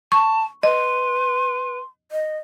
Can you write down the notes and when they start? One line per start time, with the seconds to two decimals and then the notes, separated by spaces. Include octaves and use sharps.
0.12 A5 C#6
0.63 B4 D#5 C6
2.12 D#5